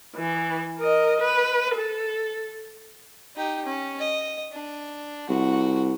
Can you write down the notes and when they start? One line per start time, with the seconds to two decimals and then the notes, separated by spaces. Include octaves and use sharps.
0.16 E3
0.78 A#4 D#5
1.20 B4
1.75 A4
3.36 D#4 G4
3.65 C#4
4.00 D#5
4.52 D4
5.29 C2 F#4